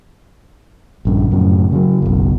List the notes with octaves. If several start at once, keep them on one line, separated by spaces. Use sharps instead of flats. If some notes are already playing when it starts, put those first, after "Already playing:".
A#1 G2 C#3
F#2 A2 C#3
C#3 F#3
F#1 B1